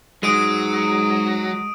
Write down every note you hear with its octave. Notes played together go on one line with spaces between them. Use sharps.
G#2 F#3 G#3 D#6 D7 D#7